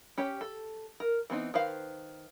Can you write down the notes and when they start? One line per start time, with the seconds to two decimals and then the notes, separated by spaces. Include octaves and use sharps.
0.18 C#4 G4 C#5
0.41 A4
1.00 A#4
1.30 E3 B3 C4 D#4
1.54 D#3 B4 C5 F5